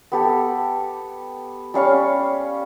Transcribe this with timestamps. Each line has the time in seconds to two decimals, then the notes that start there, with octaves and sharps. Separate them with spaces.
0.12 B3 G4 A4
1.74 G3 C#4 F5 C#6